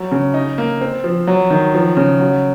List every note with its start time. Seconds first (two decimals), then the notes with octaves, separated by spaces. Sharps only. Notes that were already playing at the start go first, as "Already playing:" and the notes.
Already playing: F#3
0.12 C#3
0.34 D#4
0.58 A#3
0.81 C4
1.04 F3
1.27 F#3
1.50 D#3
1.74 F3
1.97 C#3
2.20 F#3